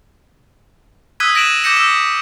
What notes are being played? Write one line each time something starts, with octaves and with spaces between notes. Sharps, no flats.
D#6 E6 F#6 G#6 B6 D#7
A#6 D7 E7 F#7
D6 G6 A#6 C#7 E7
E6